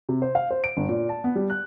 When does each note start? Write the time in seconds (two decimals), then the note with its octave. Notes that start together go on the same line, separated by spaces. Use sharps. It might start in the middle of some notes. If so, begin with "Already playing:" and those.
0.09 C3
0.22 C5
0.35 F5
0.51 C5
0.64 D7
0.77 G1
0.89 A#2
1.09 A5
1.24 B3
1.36 G3
1.50 F#6